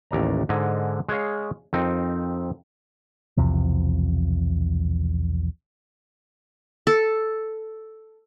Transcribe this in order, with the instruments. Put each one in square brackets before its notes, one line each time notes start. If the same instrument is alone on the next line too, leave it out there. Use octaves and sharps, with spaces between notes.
[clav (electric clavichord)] A1 D#2 D5 A#5
G#2 D3 D#5 G#5
G#3 G#4 C#5 F5
F2 C4 D#4 A#4
[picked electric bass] B1 E2 C3 F3
[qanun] A4